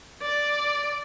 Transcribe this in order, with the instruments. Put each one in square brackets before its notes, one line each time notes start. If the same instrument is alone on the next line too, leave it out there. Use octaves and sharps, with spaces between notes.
[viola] D5